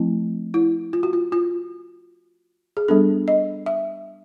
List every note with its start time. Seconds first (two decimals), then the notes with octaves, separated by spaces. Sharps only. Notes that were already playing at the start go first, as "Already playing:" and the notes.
Already playing: F3 A3 C4 E4
0.54 E4
0.93 F4
1.03 F#4
1.13 F4
1.32 F4
2.77 G#4
2.88 G3 B3 D4 A4
3.28 D#5
3.66 E5